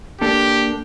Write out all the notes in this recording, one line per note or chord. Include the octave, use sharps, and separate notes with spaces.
A#3 D4 G4 A4